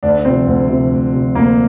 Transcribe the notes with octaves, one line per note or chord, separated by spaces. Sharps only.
D2 D4
C3 F3 C4
D2
C3 F3
D2
C3 F3
D2 A#3